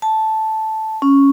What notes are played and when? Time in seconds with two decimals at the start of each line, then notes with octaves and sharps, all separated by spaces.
0.02 A5
1.02 C#4